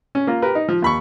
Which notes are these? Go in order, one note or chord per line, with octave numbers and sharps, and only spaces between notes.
C#4
A#3 F4
G4 A#4 B4
D#4
F3
D#2 B5 C#6